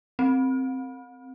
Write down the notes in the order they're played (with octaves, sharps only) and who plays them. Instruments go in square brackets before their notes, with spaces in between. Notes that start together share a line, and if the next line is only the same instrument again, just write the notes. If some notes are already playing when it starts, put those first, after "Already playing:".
[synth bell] C4